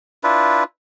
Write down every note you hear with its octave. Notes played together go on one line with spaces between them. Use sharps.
D4 E4 F4 B4